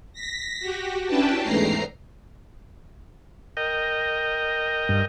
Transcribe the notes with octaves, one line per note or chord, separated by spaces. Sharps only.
A#6 B6
F#4 G4
C#4 D4 E4 B4 G5 A5
E2 G#2 A3 A#5 C7
A#4 D#5 G5
G2